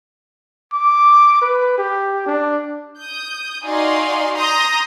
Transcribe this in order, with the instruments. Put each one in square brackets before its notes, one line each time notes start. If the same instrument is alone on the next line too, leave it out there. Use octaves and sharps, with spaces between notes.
[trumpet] D6
B4
G4
D4
[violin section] D#6 G6
D#4 F#4 D5 F5 G#5 C6
A#5 C6 D#6 G6 A#6